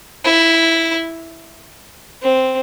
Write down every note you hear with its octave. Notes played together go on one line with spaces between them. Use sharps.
E4
C4